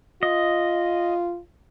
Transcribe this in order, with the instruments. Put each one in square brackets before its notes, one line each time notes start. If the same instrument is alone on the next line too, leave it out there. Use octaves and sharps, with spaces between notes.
[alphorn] F4 [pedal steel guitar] D#5